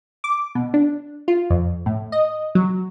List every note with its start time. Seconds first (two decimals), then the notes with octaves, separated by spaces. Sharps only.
0.24 D6
0.55 B2
0.74 D4
1.28 F4
1.50 F2
1.86 A2
2.12 D#5
2.55 F#3